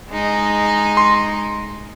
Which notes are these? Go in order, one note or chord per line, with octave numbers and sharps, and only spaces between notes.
G#3 D#4
C6